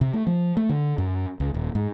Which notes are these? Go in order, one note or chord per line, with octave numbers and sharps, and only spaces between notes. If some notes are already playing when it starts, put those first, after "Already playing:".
C3
A3
F3
A3
D3
F#2
C#2
D#1
G#2